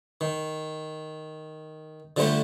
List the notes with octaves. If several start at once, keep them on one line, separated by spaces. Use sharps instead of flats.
D#3
D3 F3 G3 A3 C5